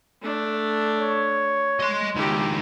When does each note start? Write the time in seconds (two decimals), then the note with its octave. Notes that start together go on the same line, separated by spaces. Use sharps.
0.22 A3 D4
0.97 C#5
1.80 D#5 C6
2.15 C#2 D#3 E4 G4